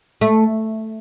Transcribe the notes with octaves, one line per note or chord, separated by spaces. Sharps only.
A3